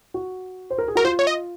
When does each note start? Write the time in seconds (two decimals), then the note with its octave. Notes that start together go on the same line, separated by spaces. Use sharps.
0.14 F#4
0.70 C5
0.78 A#4
0.88 G#4
0.95 F#4 A#4
1.04 F4 C5
1.19 C#5
1.27 D#5